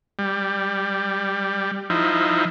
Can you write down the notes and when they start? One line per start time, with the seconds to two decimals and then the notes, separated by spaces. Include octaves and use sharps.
0.19 G3
1.90 F3 D#4 E4